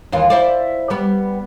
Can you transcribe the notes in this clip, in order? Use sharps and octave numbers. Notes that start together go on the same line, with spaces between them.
D#2 E3 F4
E4 C5 D5
G3 B3